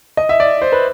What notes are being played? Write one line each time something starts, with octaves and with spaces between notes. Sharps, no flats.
D#5
E5
D5
C5
B4